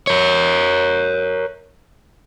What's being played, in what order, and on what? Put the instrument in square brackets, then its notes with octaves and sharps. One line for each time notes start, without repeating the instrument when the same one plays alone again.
[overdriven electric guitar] A#4 C#5